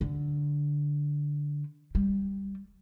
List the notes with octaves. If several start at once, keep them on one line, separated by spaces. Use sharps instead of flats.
D3
G3